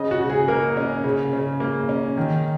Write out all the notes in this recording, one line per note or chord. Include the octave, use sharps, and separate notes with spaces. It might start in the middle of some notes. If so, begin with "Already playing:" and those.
Already playing: C#3 C#4 D#5
F#4
C#3
G#4
A#3 A#4
C#4
C#3
C#3
A#3
C#4
D#3